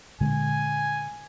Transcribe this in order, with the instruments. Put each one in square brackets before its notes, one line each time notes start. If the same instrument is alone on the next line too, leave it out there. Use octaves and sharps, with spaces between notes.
[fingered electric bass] A#2 D3 G#3 [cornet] G#5